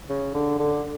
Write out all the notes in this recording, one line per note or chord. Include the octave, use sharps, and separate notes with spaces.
C#3
D3
D3